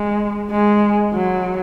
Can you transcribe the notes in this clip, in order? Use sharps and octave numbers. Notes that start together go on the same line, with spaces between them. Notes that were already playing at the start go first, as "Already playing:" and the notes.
Already playing: G#3
G#3
F#3